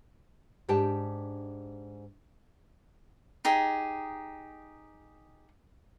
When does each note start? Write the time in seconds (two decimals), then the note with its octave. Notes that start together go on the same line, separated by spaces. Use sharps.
0.68 G#2 D4 G4 G5 A5
3.45 D#4 G4 G#4